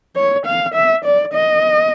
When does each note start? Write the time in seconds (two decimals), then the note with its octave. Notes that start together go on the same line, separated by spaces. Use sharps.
0.16 C#5
0.46 F5
0.75 E5
1.05 D5
1.33 D#5